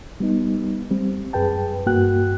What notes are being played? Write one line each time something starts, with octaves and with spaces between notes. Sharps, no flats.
G3 B3 D#4
G3 C4
F#2 G#4 B4 G5 A5
G2 A#3 F#4 G5 F#6